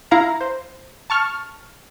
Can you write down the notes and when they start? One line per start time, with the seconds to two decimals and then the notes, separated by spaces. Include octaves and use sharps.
0.11 E4 F5 A#5
0.41 C5
1.10 A5 C#6 F6